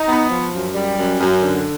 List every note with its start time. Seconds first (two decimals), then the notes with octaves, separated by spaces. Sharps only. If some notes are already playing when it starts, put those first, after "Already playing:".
Already playing: D#4
0.08 B3
0.31 F3
0.53 F#2
0.74 G3
0.97 F#2
1.19 F#2
1.41 D3